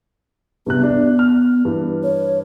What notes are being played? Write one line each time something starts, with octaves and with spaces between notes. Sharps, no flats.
G2 C3 B3 F#6
D4
F6
G2 E3
C#5